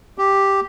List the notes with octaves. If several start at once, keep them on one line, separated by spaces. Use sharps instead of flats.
G4